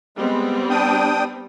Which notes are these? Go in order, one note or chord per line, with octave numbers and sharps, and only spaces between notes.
G3 G#3 B3 C4
D4 G5 D#6